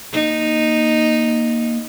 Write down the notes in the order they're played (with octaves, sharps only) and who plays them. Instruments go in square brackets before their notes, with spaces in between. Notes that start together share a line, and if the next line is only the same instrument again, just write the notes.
[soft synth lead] A#3 [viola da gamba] D#4